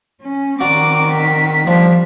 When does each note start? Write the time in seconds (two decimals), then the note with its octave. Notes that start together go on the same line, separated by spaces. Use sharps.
0.22 C#4
0.61 D#3 C4 F#4 D5 A#5 D6
1.12 B6
1.67 F3 G3 D4